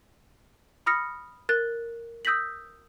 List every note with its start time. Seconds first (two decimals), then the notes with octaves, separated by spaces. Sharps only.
0.86 B5 D#6 F6 A#6 C#7
1.49 A#4 F#6 A6
2.25 D#6 E6 G6 A#6 B6 F#7